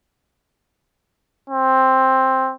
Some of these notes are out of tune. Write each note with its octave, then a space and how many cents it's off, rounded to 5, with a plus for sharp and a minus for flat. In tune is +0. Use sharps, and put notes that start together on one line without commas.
C4 +10